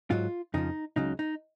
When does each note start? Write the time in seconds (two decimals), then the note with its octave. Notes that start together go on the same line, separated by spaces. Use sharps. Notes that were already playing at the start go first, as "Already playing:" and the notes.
0.10 G#2 F#3 F4
0.54 F2 C#3 F3 D#4
0.96 C#2 C#3 F#3 D#4
1.19 D#4